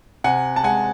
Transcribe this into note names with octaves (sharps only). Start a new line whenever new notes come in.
C3 F#5 G#5
A5
G#3 F#5 G#5